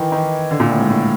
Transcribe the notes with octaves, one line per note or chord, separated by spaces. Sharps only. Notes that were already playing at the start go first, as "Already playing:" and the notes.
Already playing: D#3 E3
D#3
D3
A#2
A2
G#2
A2